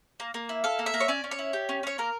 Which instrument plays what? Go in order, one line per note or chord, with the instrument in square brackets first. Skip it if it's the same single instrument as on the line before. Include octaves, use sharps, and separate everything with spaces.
[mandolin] A#3
A#3
E4
A4 F5
A#3
E5
A#3
C#5
C#4 D5
C#4
C#5
E4
G4
C#4
C#4 C#5
A#3 A#4